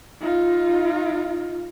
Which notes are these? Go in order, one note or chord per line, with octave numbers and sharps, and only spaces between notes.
D#4 F4